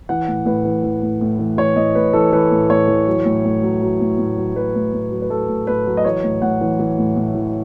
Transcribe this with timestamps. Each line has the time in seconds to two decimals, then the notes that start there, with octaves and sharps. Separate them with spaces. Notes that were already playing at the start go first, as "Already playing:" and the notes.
0.09 E3 F#5
0.28 A2
0.45 A2 B4
0.65 E3
0.83 E3
1.02 A2
1.21 A2
1.39 E3
1.57 E3 C#5
1.76 A2 D#5
1.95 A2 B4
2.13 E3 A4
2.32 E3 B4
2.51 A2
2.69 A2 C#5
2.88 E3
3.07 F#3
3.25 A2
3.44 A2
3.63 F#3
3.82 F#3
4.00 A2
4.18 A2
4.38 F#3
4.55 F#3 B4
4.75 A2
4.93 A2
5.11 F#3
5.22 B4
5.30 F#3 A4
5.48 A2
5.67 A2 B4
5.86 F#3
5.97 D#5
6.05 E3 C#5
6.23 A2
6.42 A2 F#5
6.61 E3
6.79 E3
6.98 A2
7.16 A2
7.34 E3